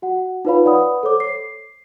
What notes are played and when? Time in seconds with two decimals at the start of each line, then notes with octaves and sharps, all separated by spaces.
0.02 F#4 F#5
0.45 D#4 F4 B4 C#5 F5 B5
0.65 B4 D5 F#5 B5 D#6
1.03 A4 C5 C#5 D6
1.20 C7